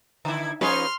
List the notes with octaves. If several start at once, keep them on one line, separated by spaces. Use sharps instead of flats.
D3 E4
F3 C#4 D#4 G#4 B4 C6 F6